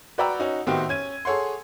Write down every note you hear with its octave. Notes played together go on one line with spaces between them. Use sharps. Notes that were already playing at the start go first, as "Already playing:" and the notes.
F#4 B4 D5 G5 A#5 E6
C#4 D#4 F#4
A2 D#3 B3 C4 F#4 G4
C#4 G#6 D#7
G#4 A4 C#5 F#5 C6